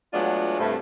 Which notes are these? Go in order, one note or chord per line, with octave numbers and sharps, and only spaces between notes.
F#3 G#3 A3 B3 D4 F4
G2 C3 A3